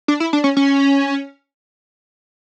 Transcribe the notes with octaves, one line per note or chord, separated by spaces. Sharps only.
D4
E4
D4
C#4
C#4